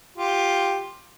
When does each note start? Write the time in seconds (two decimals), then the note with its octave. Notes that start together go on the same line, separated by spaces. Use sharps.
0.17 F4 G4